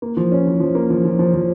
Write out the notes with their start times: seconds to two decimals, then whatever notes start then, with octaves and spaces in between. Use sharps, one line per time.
0.02 A#3
0.17 F3
0.32 C#4
0.47 F3
0.60 F3
0.75 A#3
0.90 F3
1.05 F3
1.19 F3
1.34 F3